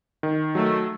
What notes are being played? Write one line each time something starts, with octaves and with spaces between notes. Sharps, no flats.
D#3
F#3 A3